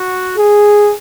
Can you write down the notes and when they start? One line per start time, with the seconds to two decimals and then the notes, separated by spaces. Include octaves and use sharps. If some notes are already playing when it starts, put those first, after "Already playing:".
Already playing: F#4
0.37 G#4